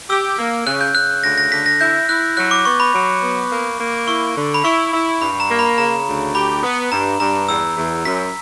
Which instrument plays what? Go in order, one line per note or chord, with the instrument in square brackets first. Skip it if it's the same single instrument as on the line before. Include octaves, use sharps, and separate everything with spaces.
[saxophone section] G4 [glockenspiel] E6
[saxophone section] A#3
[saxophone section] C#3 [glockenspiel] F#6
[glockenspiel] G6
[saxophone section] C#3 [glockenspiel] F#6
[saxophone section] D2 [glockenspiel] A#6
[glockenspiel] A#6
[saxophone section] D3 [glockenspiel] B6
[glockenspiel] A#6
[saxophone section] E4 [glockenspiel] G6
[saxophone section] E4 [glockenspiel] F#6
[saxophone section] F#3 [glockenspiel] F#6
[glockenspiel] D6
[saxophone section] B3 [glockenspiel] C#6
[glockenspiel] B5
[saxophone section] F#3
B3
A#3
A#3
[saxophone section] E4 [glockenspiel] C#6
[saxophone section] D3
[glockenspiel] B5
[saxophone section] E4 [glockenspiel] C#6
[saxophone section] E4
[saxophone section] G2 [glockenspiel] B5
[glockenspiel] A#5
[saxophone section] A#3
[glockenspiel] B5
[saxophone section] C#3 [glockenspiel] A#5
[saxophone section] D2
[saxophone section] G4 [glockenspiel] B5
[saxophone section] B3
[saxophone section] G2 [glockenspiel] A#5
[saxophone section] G2 [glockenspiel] A#5
[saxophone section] E2 [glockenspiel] E6
[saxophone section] E2
[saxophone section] F#2 [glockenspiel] B6